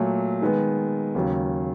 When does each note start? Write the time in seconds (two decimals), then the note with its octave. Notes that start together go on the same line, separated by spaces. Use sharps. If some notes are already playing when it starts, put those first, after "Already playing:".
Already playing: A#2 F#3 A3
0.42 D#3 G#3 B3
1.15 D#2 C#3 F#3